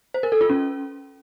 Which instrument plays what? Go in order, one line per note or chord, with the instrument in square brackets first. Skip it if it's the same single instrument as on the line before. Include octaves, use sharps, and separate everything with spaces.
[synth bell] C5
A#4
A4
F4
C#4